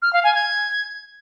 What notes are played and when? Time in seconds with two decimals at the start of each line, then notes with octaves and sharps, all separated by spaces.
0.02 F6
0.13 F5
0.24 G#5
0.35 G#6